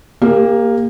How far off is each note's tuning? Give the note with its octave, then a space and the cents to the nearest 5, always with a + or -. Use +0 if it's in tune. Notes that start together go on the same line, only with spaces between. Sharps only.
A#3 +0 G4 +30 A#4 +0